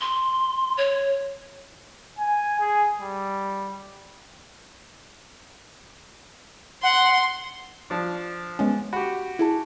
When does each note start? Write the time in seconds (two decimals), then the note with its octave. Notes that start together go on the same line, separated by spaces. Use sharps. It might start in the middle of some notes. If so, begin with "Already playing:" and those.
0.01 C6
0.77 C#5
2.19 G#5
2.60 G#4
3.00 G3
6.83 F#5 C6
7.90 F3 D4
8.59 G#3 B3 C#4
8.93 F#4 G4 B5
9.39 E4 G#4 A5